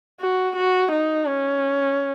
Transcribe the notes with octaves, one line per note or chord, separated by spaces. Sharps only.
F#4
F#4
D#4
C#4